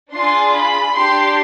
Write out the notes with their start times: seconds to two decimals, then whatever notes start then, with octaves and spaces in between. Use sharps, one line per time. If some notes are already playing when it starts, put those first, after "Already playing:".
0.11 D4 F4 G#4 C6
0.53 B5
0.94 D4 G4 C6